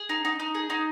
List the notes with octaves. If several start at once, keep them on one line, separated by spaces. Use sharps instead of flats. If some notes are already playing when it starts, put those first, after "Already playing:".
Already playing: G#4
D#4
D#4
D#4
G#4
D#4